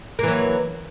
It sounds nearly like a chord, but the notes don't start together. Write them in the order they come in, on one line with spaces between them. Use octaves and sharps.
A#3 E3 F#3